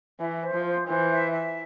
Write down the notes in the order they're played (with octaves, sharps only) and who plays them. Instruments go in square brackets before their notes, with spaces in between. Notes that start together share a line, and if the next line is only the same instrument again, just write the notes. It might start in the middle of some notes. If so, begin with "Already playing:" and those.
[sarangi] E3 [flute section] E5
[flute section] C5
[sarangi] F3
[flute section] C5
[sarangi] E3 [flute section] C5
[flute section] E5
E5